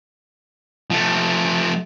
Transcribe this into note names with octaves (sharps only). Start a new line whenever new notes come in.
F3 A3